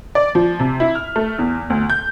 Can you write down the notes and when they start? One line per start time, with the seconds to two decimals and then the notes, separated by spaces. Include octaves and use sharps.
0.15 D5
0.35 F3
0.59 C3
0.80 E4
0.95 F6
1.16 A3
1.39 E2
1.70 D2
1.90 G6